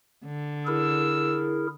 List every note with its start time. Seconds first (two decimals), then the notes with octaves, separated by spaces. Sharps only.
0.25 D3
0.67 E4 G#4 A#4 E6